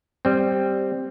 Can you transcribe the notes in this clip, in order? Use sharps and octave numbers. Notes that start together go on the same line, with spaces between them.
G3 C4